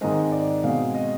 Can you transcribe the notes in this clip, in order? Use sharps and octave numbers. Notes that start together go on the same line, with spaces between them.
G#2 D#3 G#3 C4 D#5
D5
B2 G#3 C4 F5
D#5